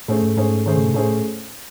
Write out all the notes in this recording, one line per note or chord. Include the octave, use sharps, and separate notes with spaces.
A2 A3 C#4 G#4 C5
G#2
G#2 A3 C#4 G#4 C5
D#3 A3 C#4 G#4 C5
C#3
C3
A2 A3 C#4 G#4 C5